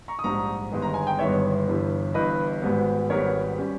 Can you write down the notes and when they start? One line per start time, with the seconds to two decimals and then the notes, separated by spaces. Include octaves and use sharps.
0.08 A#5 C#6
0.19 D#6
0.24 A#1 G#2 G3 A#5 C#6
0.72 G1 G2 D#3 G#3 B3
0.82 A#5
0.94 G#5
1.07 G5
1.19 G1 G2 D#3 G#3 B3 C#5 E5
1.68 G1 G2 E3 G3
2.14 G1 G2 E3 G3 B4 D#5
2.62 G#1 G#2 G3 B3
3.10 G#1 G#2 G3 B3 A#4 C#5
3.58 G3 C#4